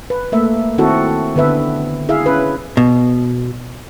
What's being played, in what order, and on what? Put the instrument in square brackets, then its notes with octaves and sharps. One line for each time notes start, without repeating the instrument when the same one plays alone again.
[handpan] B4
A3 A#3 E5
D#3 C4 E4 F#4 A4
D3 B3 B4 E5
E4 G#4 E5 F5
C#4 B4
[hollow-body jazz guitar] B2